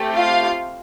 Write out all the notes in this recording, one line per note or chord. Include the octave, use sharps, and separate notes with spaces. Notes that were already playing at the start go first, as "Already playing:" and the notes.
Already playing: A3 C4 G4
F4 F5